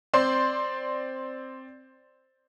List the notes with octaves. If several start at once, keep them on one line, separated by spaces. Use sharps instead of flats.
C4 D5 C6 G6